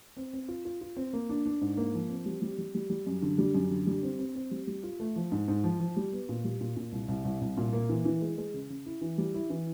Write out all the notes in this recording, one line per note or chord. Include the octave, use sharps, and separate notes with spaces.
C4
C4
F4
F4
F4
C4
A#3
D4
D4
G#2
A#3
F3
C4
G3
G3
G3
G3
G3
F#2
D3
G3
F#2
D3
G3
C4
C4
C4
G3
G3
F4
A3
F3
G#2
G#2
F3
F3
G3
B3
A#2
G3
A#2
A#2
C2
C2
C2
C2
A#2
A#3
E3
E3
G#3
G#3
C#3
C#3
E4
E3
G3
E4
E3